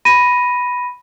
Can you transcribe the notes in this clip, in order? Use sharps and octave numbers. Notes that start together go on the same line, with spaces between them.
B5 A#6 D#7